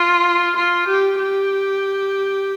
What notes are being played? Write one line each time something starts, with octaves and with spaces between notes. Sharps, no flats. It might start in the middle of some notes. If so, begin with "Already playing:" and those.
Already playing: F4
F4
G4
G4